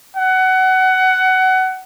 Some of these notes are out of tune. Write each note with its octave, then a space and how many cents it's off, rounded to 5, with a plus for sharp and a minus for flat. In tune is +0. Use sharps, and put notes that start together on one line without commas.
F#5 +20